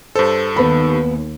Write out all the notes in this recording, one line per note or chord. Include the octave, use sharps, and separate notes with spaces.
G2 A4 C5
D#2 B3 B5